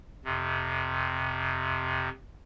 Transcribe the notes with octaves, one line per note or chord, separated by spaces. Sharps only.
F2 C3